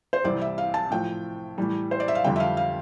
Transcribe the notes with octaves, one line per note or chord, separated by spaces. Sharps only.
C5
C2 C3 E3 G3 D5
E5
F5
A5
A2 F3 G5
A2 E3 G3
C5
D5
E5
F5
F2 D3 G3 G5
E5
F5
F5